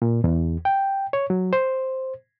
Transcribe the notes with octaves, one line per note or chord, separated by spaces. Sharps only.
A#2
E2
G5
C#5
F#3
C5